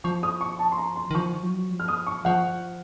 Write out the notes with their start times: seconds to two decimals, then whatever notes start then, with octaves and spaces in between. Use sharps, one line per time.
0.04 F3 C#6
0.23 D#6
0.41 C#6
0.59 A5
0.71 C6
0.77 A#5
0.96 C6
1.11 D#3
1.15 F3 C#6
1.43 F#3
1.70 F3
1.80 F6
1.88 D#6
2.07 C#6
2.25 F3 F#5